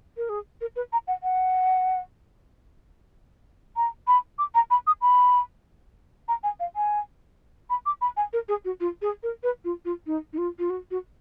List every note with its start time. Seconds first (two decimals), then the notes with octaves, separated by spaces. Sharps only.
0.17 A#4
0.29 G#4
0.61 A#4
0.76 B4
0.93 A#5
1.07 F#5
1.23 F#5
3.76 A#5
4.07 B5
4.38 D6
4.55 A#5
4.70 B5
4.87 D#6
5.01 B5
6.28 A#5
6.43 G#5
6.60 F5
6.76 G#5
7.70 B5
7.86 D6
8.01 B5
8.17 G#5
8.33 A#4
8.48 G#4
8.65 F#4
8.80 F4
9.02 G#4
9.23 A#4
9.43 B4
9.65 F4
9.85 F4
10.06 D#4
10.33 D#4
10.38 F4
10.59 F4
10.70 F#4
10.91 F#4